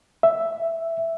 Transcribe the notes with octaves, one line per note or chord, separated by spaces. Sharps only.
E5